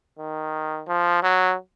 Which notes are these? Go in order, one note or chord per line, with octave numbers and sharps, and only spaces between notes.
D#3
F3
F#3